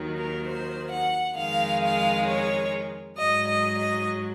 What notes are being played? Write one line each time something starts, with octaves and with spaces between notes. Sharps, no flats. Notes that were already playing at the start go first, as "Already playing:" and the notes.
Already playing: D#2 D#3 F#3
A#4
C5
F#5
F2 D#3 G#3 F5
F5
C#5
G#2 F#3 D#5
D#5
D#5